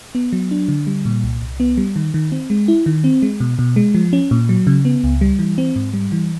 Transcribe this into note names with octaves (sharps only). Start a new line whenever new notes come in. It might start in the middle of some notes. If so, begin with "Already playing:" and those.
B3
F#3
D4
D3
G3
A#2
C2
C2
B3
G3
D#3
D#3
C4
G#3
E4
D#3
C4
G#3
B2
B2
G#3
F3
C#4
A#2
F#3
C#3
B3
C#2
G3
E3
C4
G#2
G3
E3